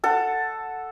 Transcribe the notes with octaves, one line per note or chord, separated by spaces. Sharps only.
A4 F#5